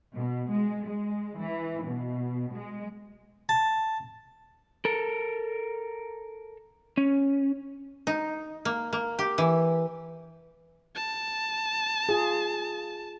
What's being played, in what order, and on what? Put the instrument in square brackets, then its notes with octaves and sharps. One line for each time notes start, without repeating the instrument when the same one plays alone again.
[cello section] B2
G#3
G#3
E3
B2
G#3
[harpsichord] A5
[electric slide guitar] A4 A#4
C#4
[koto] D#4
A#3
A#3
G4
E3
[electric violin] A5
[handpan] F4 G#4